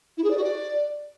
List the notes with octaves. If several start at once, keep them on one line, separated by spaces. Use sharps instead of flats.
E4
G#4
D5
F#4
D5